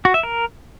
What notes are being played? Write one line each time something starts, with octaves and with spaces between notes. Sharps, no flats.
F#4
E5
A#4